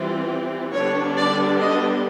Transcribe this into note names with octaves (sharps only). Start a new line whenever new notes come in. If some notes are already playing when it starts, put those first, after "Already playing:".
Already playing: E3 G3 C4 F4
D3 G3 B3 D4 C#5
D5
D#5